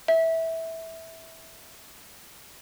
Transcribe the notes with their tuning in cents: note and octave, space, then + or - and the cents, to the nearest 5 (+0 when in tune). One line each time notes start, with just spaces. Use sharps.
E5 -15